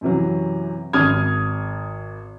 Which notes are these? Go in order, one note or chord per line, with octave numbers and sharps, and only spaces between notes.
F#2 C3 E3 F#3
G#1 D#6 F6 G#6